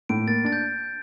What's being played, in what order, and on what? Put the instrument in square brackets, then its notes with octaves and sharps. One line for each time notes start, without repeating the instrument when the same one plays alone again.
[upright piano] A2 [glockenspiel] D7
[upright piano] A#3 [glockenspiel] A6
[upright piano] D4 [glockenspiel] A6
[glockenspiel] G6